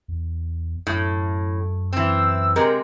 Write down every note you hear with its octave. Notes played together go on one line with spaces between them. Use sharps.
E2
F#2 A2
E3 C4 E6
C3 G#3 A#4